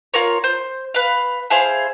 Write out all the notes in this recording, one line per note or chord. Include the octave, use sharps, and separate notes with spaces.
F4 A#4 C#5
C5
B4 F5
E4 G#4 C5 F5